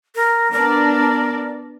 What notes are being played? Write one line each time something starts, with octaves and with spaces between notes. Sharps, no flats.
A#4
B3 D4 A#4 D5